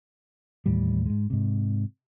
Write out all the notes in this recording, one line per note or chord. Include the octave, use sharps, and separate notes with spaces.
D#2 A2 E3 G3
G#2 G#3
G#2 C3